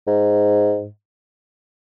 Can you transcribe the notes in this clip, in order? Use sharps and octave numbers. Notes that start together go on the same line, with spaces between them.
G#2